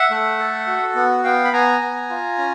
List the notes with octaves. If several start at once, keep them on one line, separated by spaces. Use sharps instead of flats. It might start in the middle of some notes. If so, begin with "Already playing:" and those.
Already playing: E5 F#5
A3
A4
F#4
B3
B3 F5 G5
B5
B3 G#5 A#5
B3
F4
C#4